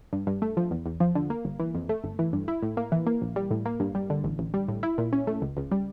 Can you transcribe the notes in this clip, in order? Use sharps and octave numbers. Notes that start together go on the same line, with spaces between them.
G2
G2
A3
F3
E2
E2
F3
D3
A#3
G1
E3
F2
A3
G1
E3
G2
E4
A2
A#3
E3
A#3
A#1
G3
A2
A#3
G2
G3
D3
A1
A1
G3
A2
E4
A#2
C#4
A3
C#2
C#2
G3